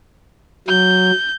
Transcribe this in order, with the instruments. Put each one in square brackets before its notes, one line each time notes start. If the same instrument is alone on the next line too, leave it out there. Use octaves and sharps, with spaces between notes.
[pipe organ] F#3 [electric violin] G6